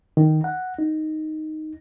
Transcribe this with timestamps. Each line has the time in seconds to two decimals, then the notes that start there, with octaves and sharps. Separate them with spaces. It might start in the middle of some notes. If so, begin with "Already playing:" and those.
0.17 D#3
0.44 F#5
0.79 D#4